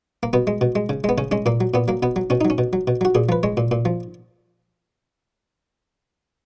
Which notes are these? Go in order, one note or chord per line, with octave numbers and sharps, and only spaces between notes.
A#3
B2 B3
G#3
B2
G#3
C#3
G#3 B3
C#3 C#4
G#3 C#4
A#2 A#3
F#3
A#2 B3
F#3 A#3
B2 B3
F#3
B2 C#4
D#4
F#3
C#4
B2
F#3
B2
F#3 F#4
A#2 G#4
F3 B4
G#3 C#5
A#2
A#2
F3